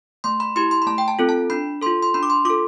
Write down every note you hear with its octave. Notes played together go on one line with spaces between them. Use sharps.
A3 C6
B5
E4 G4 C6
C6
B5
A3 A5
G5
A5
C4 F4 A4
A5
D4 B5
F4 A4 C6
C6
D4 B5
D6
C6
F4 A4 D6